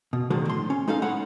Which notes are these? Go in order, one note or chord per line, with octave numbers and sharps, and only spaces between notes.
B2
D3 D#3 F3 F#3 G#3
A2 C6
C#4
G#3 D#4 A4 F5
A2 G#3 C#5 F#5 B5